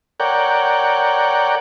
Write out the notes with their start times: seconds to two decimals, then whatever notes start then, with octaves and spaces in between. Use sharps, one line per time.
0.20 A#4 C#5 D5 F#5 G5